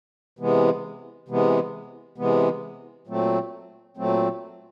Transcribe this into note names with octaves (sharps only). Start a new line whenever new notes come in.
C3 E3 G#3 B3
C3 E3 G#3 B3
C3 E3 G#3 B3
A#2 F#3 A3 C4
A#2 F#3 A3 C4